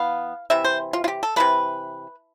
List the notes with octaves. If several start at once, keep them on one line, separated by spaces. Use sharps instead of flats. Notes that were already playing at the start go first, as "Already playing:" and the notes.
Already playing: E3 B3 F5
C3 E3 E5
C5
F4
F4
G4
A4
C3 E3 A3 B4